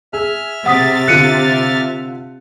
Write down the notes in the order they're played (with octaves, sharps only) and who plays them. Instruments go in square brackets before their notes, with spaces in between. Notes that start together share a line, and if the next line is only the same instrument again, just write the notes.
[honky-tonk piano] G#4 [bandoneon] E5 F6
[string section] C3 A6 [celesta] F#5 D#6 B6
[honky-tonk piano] D3 F4 [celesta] F#6 C#7 D#7